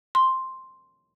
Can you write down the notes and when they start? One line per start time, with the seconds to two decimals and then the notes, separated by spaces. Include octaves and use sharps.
0.15 C6